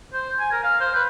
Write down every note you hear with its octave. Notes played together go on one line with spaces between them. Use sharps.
C5
G#5
A#4
F5
C5
B4